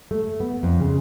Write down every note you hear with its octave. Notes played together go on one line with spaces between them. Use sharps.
A3
B3
F2
C#3